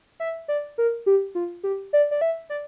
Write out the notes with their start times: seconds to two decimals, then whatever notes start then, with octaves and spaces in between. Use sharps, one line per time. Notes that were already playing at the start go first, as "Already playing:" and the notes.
0.20 E5
0.48 D5
0.78 A#4
1.06 G4
1.35 F4
1.63 G4
1.93 D5
2.11 D5
2.21 E5
2.50 D5